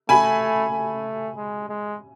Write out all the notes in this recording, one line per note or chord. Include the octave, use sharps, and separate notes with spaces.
A3 G#5 B5
A3
G#3
G#3